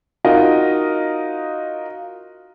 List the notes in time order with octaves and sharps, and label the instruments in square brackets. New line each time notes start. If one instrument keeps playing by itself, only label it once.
[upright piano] D#4 F4 F#4 A#4 D#5